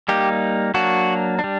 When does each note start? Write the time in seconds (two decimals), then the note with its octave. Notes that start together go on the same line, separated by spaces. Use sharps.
0.09 G3 A#3 D#4 G4
0.74 F#3 A#3 D4 F#4
1.39 D4
1.44 G3